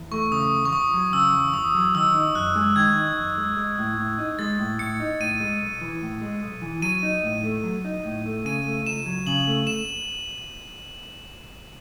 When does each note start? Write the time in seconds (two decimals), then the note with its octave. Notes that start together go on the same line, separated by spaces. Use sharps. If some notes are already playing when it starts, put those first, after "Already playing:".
Already playing: E2
0.12 A3 C#6
0.32 C#3 D#6
0.52 E2
0.65 C#6
0.73 E2 D#6
0.94 F#3
1.13 C#3 E6
1.33 E2
1.53 E2 D#6
1.75 F#3
1.95 D#3 E6
2.15 D#4
2.35 F#2 F#6
2.55 G#3
2.76 D#3 G#6
2.96 D#4
3.17 F#2
3.38 G#3
3.57 G#3
3.78 A2
3.97 A2
4.18 D#4
4.39 G#3 A6
4.59 A2
4.79 A2 C#7
5.00 D#4
5.20 A2 D#7
5.40 G#3
5.61 B1
5.81 E3
6.02 A2
6.21 G#3
6.42 B1
6.62 E3
6.82 F#3 D#7
7.03 D#4
7.23 A2
7.44 A3
7.64 F#3
7.85 D#4
8.05 A2
8.26 A3
8.45 C#3 D#7
8.66 A3
8.86 C#2 E7
9.06 F#3
9.27 C#3 F#7
9.47 A3
9.67 E7